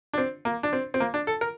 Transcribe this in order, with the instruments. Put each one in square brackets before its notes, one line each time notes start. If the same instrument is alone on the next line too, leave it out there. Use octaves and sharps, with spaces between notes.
[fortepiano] D4
C4
A#3
D4
C4
C4
A#3
D4
A4
A#4